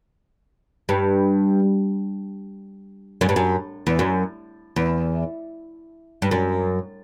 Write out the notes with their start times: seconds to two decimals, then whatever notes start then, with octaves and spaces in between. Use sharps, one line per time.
0.89 G2
3.21 F#2
3.29 G2
3.36 F#2
3.87 E2
3.99 F#2
4.76 E2
6.22 G2
6.31 F#2